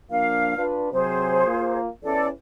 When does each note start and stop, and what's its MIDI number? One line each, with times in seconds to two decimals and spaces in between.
0.10 0.53 53
0.10 0.53 58
0.10 0.53 62
0.10 0.64 77
0.56 0.89 62
0.56 0.89 65
0.56 0.89 71
0.92 1.45 48
0.92 1.45 54
0.92 1.79 68
0.92 1.79 72
1.46 1.88 58
1.46 1.88 65
2.04 2.29 40
2.04 2.29 52
2.04 2.29 61
2.04 2.25 69
2.04 2.25 74